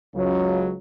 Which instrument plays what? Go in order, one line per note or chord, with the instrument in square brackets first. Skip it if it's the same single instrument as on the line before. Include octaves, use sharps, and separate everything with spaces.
[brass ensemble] C#2 C#3 F#3